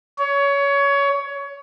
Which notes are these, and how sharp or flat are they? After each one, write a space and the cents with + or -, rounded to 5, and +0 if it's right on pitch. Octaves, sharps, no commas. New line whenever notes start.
C#5 +20